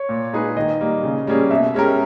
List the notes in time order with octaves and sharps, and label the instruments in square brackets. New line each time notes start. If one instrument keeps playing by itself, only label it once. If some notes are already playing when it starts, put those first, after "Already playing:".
Already playing: [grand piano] C#5
[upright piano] A#2
G#3 D#4 G#4 B4
[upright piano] D#3 [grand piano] D#5
[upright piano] G3 A#3
C#3
G3 A#3 C#4 G#4
[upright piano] B2 [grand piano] E5
[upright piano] G#3 C#4 G4 A#4